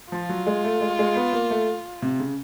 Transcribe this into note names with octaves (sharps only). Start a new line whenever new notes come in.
F3 F4
F#3
G#3
A3
G#3
G#3
B3
A#3
A3
C3
C#3